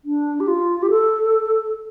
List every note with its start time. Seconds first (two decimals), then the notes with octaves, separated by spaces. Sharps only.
0.05 D4
0.40 G4
0.48 F4
0.82 G4
0.90 A4